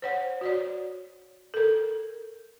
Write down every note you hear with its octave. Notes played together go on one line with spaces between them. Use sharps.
C5 C#5 F#5
F#4 C#5 D5
A4 A#4